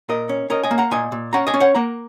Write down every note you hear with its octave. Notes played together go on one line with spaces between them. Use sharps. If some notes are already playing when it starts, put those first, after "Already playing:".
A#2 A#4 D#5
C#4
C#4 A#4 D#5
D#5 G#5
A#3
F#5 A#5
A#2 D#5 G#5
A#2
C#4 F#5 A#5
D#5 G#5
C#4
C#5 F#5
A#3 F#5 A#5